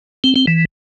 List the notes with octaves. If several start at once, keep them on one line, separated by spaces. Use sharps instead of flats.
C4
C4
E3